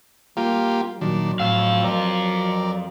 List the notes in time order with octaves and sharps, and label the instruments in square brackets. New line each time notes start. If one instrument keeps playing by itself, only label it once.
[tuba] G3 [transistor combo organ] A#3 F4 G4
[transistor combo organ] A#2 D#3 D4 [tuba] F#3
[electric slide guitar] F2 F5 [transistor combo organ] A2 E6
[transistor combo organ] A#4 D5